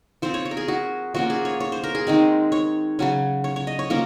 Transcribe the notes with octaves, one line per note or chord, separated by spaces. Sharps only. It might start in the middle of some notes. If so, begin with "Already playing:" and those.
F3 C4 C5
C#5
C#5
A#4
G#4
F#4
F3 A#3 C#4 F#4
G#4
C#5
C#5
C5
A#4
G#4
D#3 G#3 C4
C#5
C#3 F#3 C#4
C#5
C#5
D#5
C#5
F3 A#3 C#4 A#4